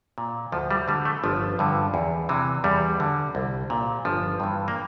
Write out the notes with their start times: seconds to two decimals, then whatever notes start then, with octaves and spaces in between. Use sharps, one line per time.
0.18 A#2
0.52 D2 F3
0.71 G3
0.88 D3 G3
1.05 A3
1.24 G1 F3
1.59 G2 D3
1.94 E2
2.29 C3 E3
2.64 E2 G3
3.00 D3
3.35 C2
3.70 A#2
4.05 G1 F3
4.40 G2 E3
4.68 A#3